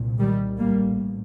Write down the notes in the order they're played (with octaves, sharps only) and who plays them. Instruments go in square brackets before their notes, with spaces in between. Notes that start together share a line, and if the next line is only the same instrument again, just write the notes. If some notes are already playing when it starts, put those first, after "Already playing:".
Already playing: [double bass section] C2 A#2
D#3 G3
A1 A2 G3 A#3